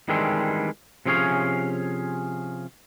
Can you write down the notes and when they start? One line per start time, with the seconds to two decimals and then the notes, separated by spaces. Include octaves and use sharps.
0.08 D#3 E3 G3 G#3 C4 D4
1.06 C3 F3 C#4 G#4 C#5 F5